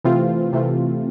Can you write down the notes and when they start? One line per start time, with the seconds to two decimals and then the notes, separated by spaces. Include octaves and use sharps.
0.04 C3 E3 A3 C4 F4
0.53 C3 E3 A3 C4 F4